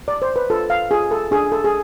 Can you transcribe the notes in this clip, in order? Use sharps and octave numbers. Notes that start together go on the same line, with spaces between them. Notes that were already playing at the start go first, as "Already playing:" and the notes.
D5
C5
B4
F4 A4
F5
F4 G#4
A4
D4 G#4
A4
G#4